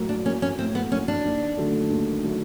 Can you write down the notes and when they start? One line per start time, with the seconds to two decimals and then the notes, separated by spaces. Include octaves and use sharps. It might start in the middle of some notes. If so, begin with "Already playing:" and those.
Already playing: A2 F#3 A#3
0.09 D4
0.26 F#3 A#3 C#4
0.42 C#4
0.59 A2 C4
0.75 B3
0.91 A#3 C#4
0.96 F#3
1.08 D4
1.25 D#2
1.57 D3 F#3 A3
1.91 D#2
2.24 D3 F#3 A3